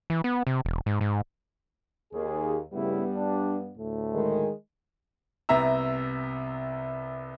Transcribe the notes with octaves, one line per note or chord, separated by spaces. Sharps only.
E3
B3
C3
E1
G#2
G#2
D#2 G#4
G2 C#3 G3 A3 B3 E4
D4
D2 A2 A3
D#3 G#3
C2 C3 B3 E5 A#5 E6